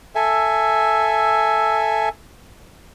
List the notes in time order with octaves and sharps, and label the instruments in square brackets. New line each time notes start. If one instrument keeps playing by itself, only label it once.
[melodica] A4 E5 G#5